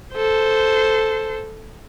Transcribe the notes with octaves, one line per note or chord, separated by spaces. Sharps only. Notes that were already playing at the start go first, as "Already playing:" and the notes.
A4 C5